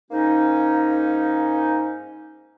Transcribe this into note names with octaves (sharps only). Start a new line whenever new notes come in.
G#2 A#3 C#4 D#4